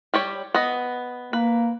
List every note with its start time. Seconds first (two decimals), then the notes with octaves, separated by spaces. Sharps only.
0.14 G3 G4 C#5
0.54 B3 D#5
1.33 A#3 B4